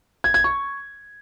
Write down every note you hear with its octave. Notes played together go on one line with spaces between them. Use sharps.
G#6
G#6
C#6